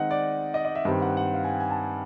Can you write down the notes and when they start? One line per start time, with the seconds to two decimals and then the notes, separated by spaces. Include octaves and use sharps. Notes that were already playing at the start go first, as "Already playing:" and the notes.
Already playing: D#3 G#3 C4 D#4 D#5 F#5
0.11 D5
0.54 D#5
0.65 D#5
0.75 E5
0.85 G2 D#3 G3 C4
1.02 F#5
1.17 F#5
1.34 F5
1.44 G#5
1.49 G5
1.60 G#5
1.70 A5